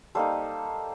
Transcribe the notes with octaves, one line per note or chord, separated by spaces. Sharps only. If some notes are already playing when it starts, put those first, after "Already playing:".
G3 A#3 D#4 A4 C5